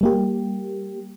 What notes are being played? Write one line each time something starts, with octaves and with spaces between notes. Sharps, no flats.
G3 A#3 G4